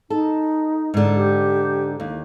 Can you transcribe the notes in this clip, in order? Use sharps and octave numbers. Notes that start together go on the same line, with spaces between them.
D#4 A4
G#2 D3
G4
D#2